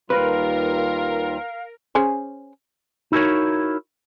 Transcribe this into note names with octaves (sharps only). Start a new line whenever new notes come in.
D#2 G3 F4 A#4 B4 F5
C#4 G#4 C5
D#4 E4 F#4 A4 A#4 C#5